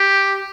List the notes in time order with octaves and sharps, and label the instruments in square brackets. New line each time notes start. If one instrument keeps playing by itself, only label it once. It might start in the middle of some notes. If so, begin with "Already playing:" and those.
Already playing: [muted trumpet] G4